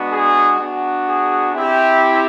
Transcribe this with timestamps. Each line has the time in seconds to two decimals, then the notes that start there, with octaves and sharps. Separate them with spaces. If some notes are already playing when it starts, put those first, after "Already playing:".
Already playing: G#3 B3 D4 F#4
0.12 G#4
0.59 B3 D4 F#4
1.07 G#4
1.54 C4 E4 G4